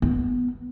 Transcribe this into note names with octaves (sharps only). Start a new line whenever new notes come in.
B3